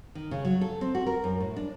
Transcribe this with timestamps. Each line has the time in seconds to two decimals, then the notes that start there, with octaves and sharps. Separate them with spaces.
0.15 D#3
0.31 C#3
0.45 F#3
0.61 A4
0.81 C4
0.95 F#4
1.06 A#4
1.24 F#2
1.40 A2
1.56 D4